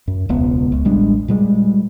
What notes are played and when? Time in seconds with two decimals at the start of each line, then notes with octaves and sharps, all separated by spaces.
0.08 F#2
0.29 E1 C#2 B3
0.72 C#2
0.85 A1 G3 G#3 D4
1.28 A#2 G3 G#3